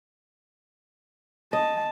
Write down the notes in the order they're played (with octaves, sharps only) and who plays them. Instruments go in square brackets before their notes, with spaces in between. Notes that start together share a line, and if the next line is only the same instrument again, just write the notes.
[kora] D#5 [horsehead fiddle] A5